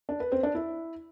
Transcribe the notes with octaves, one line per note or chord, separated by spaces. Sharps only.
D4
B4
C4
D4
E4